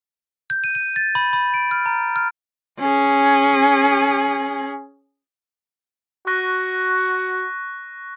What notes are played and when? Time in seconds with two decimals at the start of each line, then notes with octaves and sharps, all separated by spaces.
0.50 G6
0.64 D#7
0.75 D#7
0.96 A6
1.15 B5
1.33 B5
1.54 D7
1.71 F6
1.86 A#5
2.16 F6
2.79 C#4 G#4
6.27 F#4 C#6 F#6 A#6